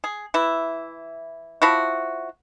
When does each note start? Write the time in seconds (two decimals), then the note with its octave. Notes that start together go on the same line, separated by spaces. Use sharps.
0.04 G#4
0.34 E3 E4
1.62 F3 E4 F#4